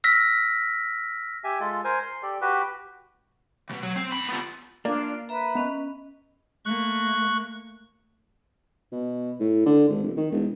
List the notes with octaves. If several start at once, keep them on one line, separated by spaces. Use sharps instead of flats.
E6 F6 A#6 B6
G4 E5 G#5
G#3 F4 A4
A#4 C5 G#5
C6
G4 A4 D5
F#4 G4 B4
D#2 B2
F#3
C4
E2 B5
B3 F4
A#3 D4 F4 D5
B4 E5 A#5
B3 C#4 D#5
A3 A#3 C#6 F#6
B2
A2
D3
G#1
F1
D#3
E1